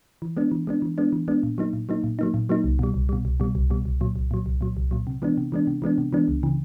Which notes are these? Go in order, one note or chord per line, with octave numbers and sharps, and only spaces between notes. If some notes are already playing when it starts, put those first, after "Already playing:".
E3
G#3 B3 D4
E3
G#3 B3 D4
E3
G#3 B3 D4
E3
G#3 B3 D4
A#2
F#3 A#3 D#4
A#2
F#3 A#3 D#4
A#2
F#3 A#3 D#4
A#2
F#3 A#3 D#4
C2
B2 G3
C2
B2 G3
C2
B2 G3
C2
B2 G3
C2
A#2 F#3
C2
A#2 F#3
C2
A#2 F#3
C2
A#2 F#3
C3
E3 G#3 B3 D4
C3
E3 G#3 B3 D4
C3
E3 G#3 B3 D4
C3
E3 G#3 B3 D4
C#2
C#3 E3